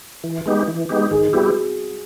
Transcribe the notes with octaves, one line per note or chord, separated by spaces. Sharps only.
E3
G#3 B3 D#4 G4
E3
G#3 B3 D#4 G4
D#3 G#4
G3 B3 E4 F#4 G4